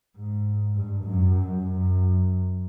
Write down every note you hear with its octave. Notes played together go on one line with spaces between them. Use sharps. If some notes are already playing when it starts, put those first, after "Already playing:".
G#2
G2
F#2
F#2